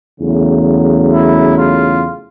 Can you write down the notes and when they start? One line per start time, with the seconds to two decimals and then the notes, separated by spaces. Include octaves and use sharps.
0.20 E2 C#3 F#3 A3
1.12 E4
1.58 F4